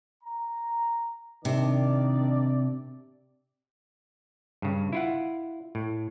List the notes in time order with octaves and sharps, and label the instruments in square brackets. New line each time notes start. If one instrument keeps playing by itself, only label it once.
[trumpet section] A#5
[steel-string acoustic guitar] C3 [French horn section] D#3 D4 [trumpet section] D5
[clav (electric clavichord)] G2 C#3
E4 F4 F#5
A2